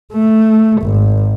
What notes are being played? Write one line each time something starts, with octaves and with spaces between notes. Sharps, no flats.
A3
G#1